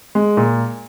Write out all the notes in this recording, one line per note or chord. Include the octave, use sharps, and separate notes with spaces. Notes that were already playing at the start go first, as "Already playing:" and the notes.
G#3
A#2